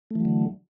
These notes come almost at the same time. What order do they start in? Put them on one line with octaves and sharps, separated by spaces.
A3 E3 F#3 D3